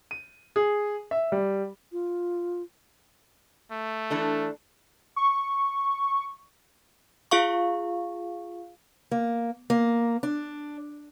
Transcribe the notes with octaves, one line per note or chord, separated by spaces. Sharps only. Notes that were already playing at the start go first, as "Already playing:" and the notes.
D#7
G#4
E5
G3
F4
A3
E3 D4 A4
C#6
F4 G#4 F5 C#6
A#3
A#3
D4